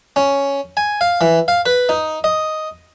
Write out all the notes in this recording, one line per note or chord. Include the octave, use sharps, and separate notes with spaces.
C#4
G#5
F5
E3
F5
B4
D#4
D#5